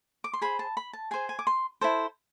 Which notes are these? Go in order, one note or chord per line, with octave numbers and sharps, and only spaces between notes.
D6
C6
G#4 C5 B5
A5
B5
A5
G#4 C5 G#5
G#5
D6
C6
E4 A4 C5